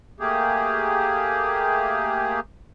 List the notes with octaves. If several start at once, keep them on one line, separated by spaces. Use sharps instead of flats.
A3 A#3 G4 G#4